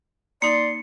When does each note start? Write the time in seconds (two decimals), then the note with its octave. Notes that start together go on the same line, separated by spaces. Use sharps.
0.42 A#3 D#4 D5 C6 C#7